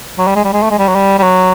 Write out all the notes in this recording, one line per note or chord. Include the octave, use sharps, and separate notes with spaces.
F#3
G3
G#3
G3
G#3
A3
G#3
G3
F#3
G3
G3
F#3